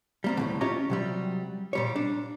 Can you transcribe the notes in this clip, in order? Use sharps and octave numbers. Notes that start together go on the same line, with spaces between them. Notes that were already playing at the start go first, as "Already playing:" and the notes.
G3 A#3 C4
D2 A2 D3
C#4 F4 G4 C#5 D#5 A#5
C3 F#3 G3
A#2 G3 C#5
D4